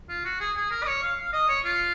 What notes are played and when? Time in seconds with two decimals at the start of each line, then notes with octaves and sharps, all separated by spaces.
0.09 F4
0.25 F#4
0.40 G#4
0.56 G#4
0.71 A#4
0.83 D#5
0.87 C#5
1.03 F5
1.18 F5
1.33 D#5
1.48 C#5
1.65 F4